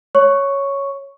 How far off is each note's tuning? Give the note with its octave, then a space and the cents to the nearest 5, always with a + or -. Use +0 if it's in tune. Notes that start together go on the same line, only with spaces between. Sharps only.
C#5 +0 C#6 +0